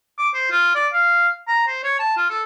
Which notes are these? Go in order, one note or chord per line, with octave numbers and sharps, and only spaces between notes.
D6
C5
F4
D5
F5
A#5
C5
C#5
A5
F4
A4